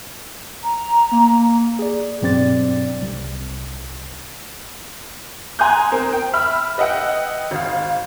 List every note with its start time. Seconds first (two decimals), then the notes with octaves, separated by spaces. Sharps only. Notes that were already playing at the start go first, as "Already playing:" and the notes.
0.63 A#5
1.11 A#3
1.79 G#4 D5
2.22 B1 G2 C4 D5 A6
3.02 C2
5.59 G#5 A#5 C6 D#6 F#6 G6
5.92 C4 A#4
6.13 G5
6.33 E5 B5 F6
6.78 B4 D#5 E5 F#5 G5
7.51 G#1 F5